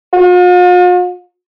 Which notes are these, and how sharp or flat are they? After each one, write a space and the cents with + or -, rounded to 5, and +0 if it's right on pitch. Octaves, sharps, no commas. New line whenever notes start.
F4 +45